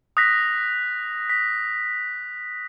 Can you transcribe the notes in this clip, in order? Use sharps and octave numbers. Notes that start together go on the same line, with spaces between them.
D#6 F#6 A#6 B6
B6